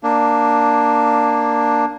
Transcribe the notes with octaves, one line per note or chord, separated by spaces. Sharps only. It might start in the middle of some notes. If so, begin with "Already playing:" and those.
A#3 D4